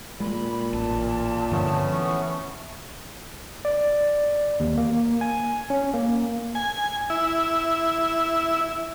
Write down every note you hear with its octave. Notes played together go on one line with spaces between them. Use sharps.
A#2 G#3 B5
A1 A5
G2 D3 F3 A3 B3 C#4
E3 C#6
D5
D#2
A#3
G#5
C#4
A#3
G#5
E4